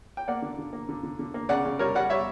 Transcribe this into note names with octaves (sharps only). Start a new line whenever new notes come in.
G5
A#3 D5 F#5
D3
D3
A#3
D3
D3
D3
A#3
C#3 D5 F#5
C#3
G3 A#4 C#5
G3 D5 F#5
G3 C#5 E5